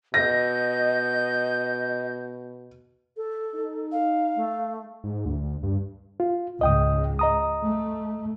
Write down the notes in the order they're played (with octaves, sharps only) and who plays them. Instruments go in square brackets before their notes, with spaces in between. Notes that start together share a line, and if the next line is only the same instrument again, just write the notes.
[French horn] B2 [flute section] D#5 [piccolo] G6 [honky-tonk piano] A#6
[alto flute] A4
[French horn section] D#4
[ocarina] F5
[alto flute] A3
[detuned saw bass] G#2
D2
G2
[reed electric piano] F4
[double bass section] C#2 G#2 G#3 [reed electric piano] D#5 G5 D#6
[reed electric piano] D#5 A#5 D#6
[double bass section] A3